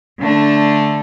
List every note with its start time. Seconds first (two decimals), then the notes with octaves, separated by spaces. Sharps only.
0.20 D3 A3 D4